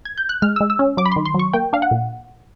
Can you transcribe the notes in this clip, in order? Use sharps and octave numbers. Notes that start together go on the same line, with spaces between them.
G#6
G6
F#6
G#3 F6
G#3 E6
E6
C#4
F#3 D6
B5
D#3 C6
C6
F#3 C#6
A#3 G5
D4 F5
F#5
A#2